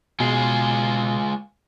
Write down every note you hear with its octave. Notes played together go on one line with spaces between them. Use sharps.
B2 G#3 F4 G#4 C7